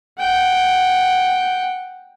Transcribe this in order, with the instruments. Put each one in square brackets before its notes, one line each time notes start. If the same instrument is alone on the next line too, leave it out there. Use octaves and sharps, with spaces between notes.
[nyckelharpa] F#5 G5